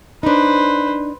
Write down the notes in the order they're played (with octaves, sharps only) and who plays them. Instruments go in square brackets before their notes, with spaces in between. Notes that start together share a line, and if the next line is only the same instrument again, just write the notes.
[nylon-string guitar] D4 D#4 [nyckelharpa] B4 C5